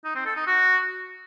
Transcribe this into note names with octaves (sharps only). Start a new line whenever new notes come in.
D#4
C4
A4
D#4
F#4